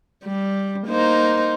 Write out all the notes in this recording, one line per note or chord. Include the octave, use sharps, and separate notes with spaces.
G3
A#3 D#4 C5